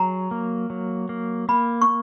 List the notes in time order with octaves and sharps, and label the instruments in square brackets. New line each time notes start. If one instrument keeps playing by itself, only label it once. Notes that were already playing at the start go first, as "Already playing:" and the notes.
Already playing: [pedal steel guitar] F#3 G#4 [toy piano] A#5
[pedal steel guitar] A#3
F#3
A#3
[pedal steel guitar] A#3 [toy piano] B5
[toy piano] C#6